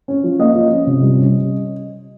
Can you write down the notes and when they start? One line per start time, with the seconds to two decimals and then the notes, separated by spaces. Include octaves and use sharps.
0.08 C#4
0.24 F3
0.39 A#3 D#5
0.55 F3
0.71 C#4
0.87 C3
1.02 G3
1.18 C#4